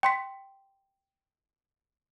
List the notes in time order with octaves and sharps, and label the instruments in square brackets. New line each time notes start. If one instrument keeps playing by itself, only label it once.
[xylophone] G5 C6 B6